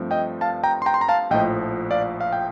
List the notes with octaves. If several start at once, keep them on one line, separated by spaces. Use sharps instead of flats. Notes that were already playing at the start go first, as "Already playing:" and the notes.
Already playing: G2 F3 A3 C4
D#5 G5
F5 A5
G5 A#5
C6
G5 A#5
C6
A#5
F5 A5
A#1 A2 F3 D#5 G5
D5 F5
F5
G5